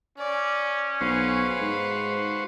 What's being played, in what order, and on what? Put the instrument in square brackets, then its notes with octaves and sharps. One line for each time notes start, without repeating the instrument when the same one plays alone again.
[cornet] C#4 [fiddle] D5
[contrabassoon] B1 [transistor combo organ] F#4 C5 C#6 [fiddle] B4 F5
[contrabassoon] G#2